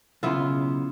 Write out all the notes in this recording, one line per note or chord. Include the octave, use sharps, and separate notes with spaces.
B1 C#3 B3 E4 F4